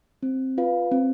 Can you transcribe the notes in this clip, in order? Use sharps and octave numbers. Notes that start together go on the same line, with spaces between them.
C4
F4 B4 F5
C4